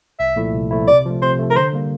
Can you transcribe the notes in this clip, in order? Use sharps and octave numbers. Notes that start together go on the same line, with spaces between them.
C2 E5
A#2 F3 A3 E4
C2
A#2 F3 A3 E4
C3 D5
F3 A3
C3 C5
F3 A3
A#4
D3 C5
G3 A#3